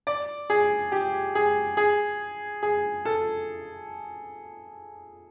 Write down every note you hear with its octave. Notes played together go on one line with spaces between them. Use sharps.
D5
G#4
G4
G#4
G#4
G#4
A4